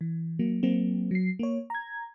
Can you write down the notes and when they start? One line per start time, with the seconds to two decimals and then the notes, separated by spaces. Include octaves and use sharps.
0.01 E3
0.39 F#3 A#3
0.63 F#3 A#3 C4
1.11 F#3 C7
1.39 A#3 C#5
1.70 A#5 G#6